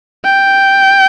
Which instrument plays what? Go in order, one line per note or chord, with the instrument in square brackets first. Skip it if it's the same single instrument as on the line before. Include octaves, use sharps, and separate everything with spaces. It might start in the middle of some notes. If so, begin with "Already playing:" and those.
[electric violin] G5